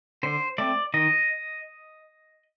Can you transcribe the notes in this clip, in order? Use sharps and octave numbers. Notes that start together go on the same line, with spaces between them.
D3 C5
A3 C4 D5
D#3 D#5